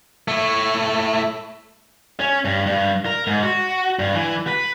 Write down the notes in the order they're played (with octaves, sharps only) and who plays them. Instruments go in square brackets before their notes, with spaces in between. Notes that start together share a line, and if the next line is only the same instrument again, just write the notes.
[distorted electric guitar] A3 E4
[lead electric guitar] C#4
G2
G2
A#4
G#2
F#4
G2
E3
B4